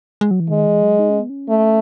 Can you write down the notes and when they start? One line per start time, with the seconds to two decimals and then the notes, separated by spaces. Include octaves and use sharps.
0.21 G#3
0.31 F#3
0.40 E3
0.50 D#3 G#3
0.66 E3
0.83 F#3
0.99 D#4
1.10 C#4
1.20 B3
1.30 C#4
1.49 A3